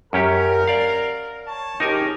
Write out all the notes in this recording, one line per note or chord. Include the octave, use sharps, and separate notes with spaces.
F#2 C#4 G4 A#4
D5 F5
C#5 A5
C#3 F3 D#4 G4 A#4 G#5